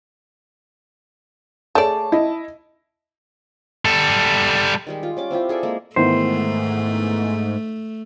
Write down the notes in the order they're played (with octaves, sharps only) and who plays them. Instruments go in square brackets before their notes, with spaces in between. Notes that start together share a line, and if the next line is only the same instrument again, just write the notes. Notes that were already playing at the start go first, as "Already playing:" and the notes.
[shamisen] A3 D5 [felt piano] G#4 C#5 [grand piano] A5
[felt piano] E4 D#5
[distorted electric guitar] G3 A4
[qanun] D#3 G3 G#3
F4
G3 C#4 D6
C4 E4 F4 G4
G#4 A4 D5 E5
G#3 A#3
[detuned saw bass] G#2 [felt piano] D#3 E3 B3 [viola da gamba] A3 [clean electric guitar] C5